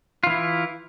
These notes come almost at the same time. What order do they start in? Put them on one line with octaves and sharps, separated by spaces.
F4 E3 E4